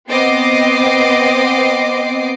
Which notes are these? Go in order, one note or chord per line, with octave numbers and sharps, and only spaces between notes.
B3 C4 D#5 D6 C7